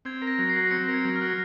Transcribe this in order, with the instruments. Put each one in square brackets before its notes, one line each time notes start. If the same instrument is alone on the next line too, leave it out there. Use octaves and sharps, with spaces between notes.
[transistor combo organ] C4 [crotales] G#6
[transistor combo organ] A#4
[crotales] A#6
[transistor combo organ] F#3
[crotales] C7
[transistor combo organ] F#4
[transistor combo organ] C4 [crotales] C#7
[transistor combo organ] A#4
[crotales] G#6
[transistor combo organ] F#3
[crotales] F6
[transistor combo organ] F#4